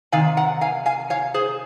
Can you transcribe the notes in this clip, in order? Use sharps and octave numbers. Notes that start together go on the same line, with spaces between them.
C3 D#3 F5 G#5
F#5 A#5
F5 G#5
F5 G#5
C#5 F5
G#4 C5